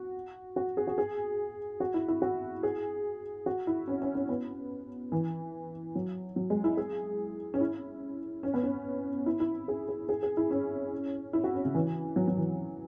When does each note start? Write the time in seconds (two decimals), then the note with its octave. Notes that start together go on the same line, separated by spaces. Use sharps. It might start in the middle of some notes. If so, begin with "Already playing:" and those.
Already playing: F#4
0.56 F#4
0.77 G#4
0.87 F#4
0.98 G#4
1.80 F#4
1.94 E4
2.08 E4
2.22 F#4
2.63 G#4
3.46 F#4
3.67 E4
3.88 C#4
4.02 C#4
4.15 C#4
4.29 B3
5.12 E3
5.95 F#3
6.36 F#3
6.50 G#3
6.64 E4
6.77 G#4
7.54 C#4
7.60 E4
8.43 C#4
8.54 B3
8.63 C#4
9.26 E4
9.40 E4
9.68 G#4
9.88 G#4
10.09 G#4
10.23 G#4
10.37 E4
10.51 C#4
11.33 E4
11.44 F#4
11.54 C#4
11.65 C#3
11.74 E3
12.16 F#3
12.28 F#3
12.37 E3